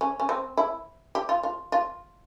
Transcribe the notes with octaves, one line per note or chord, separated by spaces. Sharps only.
C#4
C#4
C4
E4
G4
F4
F4
F4